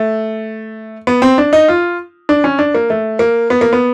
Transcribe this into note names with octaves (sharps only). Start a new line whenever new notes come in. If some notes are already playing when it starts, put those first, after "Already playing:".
Already playing: A3
B3
C4
D4
D#4
F4
D4
C#4
D4
A#3
A3
A#3
B3
A#3
B3